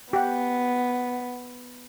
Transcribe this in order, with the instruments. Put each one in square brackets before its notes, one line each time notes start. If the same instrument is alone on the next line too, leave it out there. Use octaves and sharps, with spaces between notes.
[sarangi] B3 [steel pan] G4 F#5